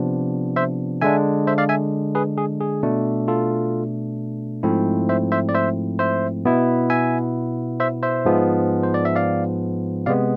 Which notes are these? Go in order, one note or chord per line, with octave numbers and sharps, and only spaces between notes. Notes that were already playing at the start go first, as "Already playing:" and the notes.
Already playing: C3 F3 B3 D4
C5 E5
D3 G#3 D4 E5 G#5
C5 E5
D5 F5
E5 G#5
G#4 B4
G#4
G#4
B2 A3 D4
F4 A4
G#2 F3 A3 C4 E4
C5 E5
C5 E5
D5
C5 E5
C5 E5
B2 B3 E4
E5 G#5
C5 E5
C5 E5
G#2 F3 G#3 B3
C5
D5
E5
D5 F5
C3 G#3 B3 D5 F5